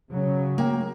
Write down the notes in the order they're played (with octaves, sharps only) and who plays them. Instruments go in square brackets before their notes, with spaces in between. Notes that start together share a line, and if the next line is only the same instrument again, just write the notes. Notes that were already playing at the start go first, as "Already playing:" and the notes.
[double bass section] C#3 F#3
[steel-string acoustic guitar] A#3 G5